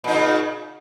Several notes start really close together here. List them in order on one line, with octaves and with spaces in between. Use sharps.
A#2 D#4 C#3